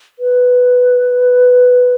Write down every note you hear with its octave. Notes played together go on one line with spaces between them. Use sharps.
B4